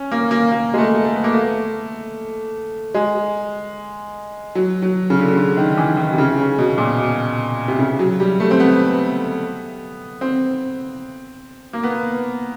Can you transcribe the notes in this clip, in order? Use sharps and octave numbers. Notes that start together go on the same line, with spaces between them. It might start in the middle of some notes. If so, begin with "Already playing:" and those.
Already playing: C#4
A#3
A#3
A#3
G#3
A3
A3
B3
A#3
A3
G#3
F#3
F#3
C#3
D3
C#3
D3
D#3
E3
D#3
C3
C#3
C#3
B2
A#2
B2
C3
C#3
F#3
G3
A3
C4
B3
C4
A#3
B3